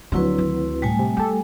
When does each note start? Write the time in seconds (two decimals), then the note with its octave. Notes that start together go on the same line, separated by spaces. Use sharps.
0.12 D2 F3 F#3 C4 D4 E4 B4
0.38 D#3
0.82 A2 G3 A3 G#5
0.99 C3
1.17 B3 G4 A4